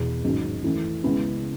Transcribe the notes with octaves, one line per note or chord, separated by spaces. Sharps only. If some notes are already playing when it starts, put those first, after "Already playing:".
Already playing: E2 B2
A1 G#2 D#3 F#3
F#2 E3 A3 E4
C#2 C#3 G#3 B3 E4